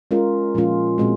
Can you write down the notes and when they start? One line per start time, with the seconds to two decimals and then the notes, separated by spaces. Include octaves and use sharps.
0.11 G#3 C#4 F4 A#4
0.55 A#2 F3 G#3 C#4 F4
0.98 A#2 G#3 C4 F#4